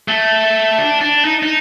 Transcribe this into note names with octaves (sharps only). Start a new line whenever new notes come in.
A3
D4
D4
D#4
D#4